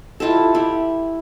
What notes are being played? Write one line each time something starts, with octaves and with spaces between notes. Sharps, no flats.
E4 F4 G4 A4
E4 G4